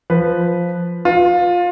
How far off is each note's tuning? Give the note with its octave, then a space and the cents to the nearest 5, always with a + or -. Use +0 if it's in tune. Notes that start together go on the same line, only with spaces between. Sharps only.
F3 +0 B4 +0
F4 +20 B4 +0